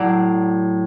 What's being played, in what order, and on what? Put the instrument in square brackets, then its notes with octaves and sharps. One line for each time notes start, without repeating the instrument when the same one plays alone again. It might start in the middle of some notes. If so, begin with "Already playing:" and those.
Already playing: [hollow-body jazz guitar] A2 F#3 D5